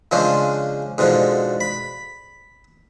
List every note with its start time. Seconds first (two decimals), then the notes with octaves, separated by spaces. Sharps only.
0.11 C#3 F3 G#3 C#4 D4 C5
0.98 G#2 B2 D3 F3
1.61 B5